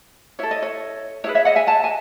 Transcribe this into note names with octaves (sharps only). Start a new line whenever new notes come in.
E4 A4 C#5
D#5
C#5
E4 G#4 B4 C#5
C#5 E5
D#5 F#5
E5 G#5
F#5 A5
G#5